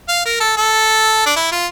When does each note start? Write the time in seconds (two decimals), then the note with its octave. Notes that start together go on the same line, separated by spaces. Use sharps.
0.09 F5
0.25 A#4
0.41 A4
0.57 A4
1.26 D4
1.36 E4
1.52 F4